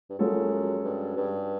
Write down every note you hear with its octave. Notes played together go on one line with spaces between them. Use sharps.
G2
F#2 F3 G#3 C#4 F#4 A4
G2
G2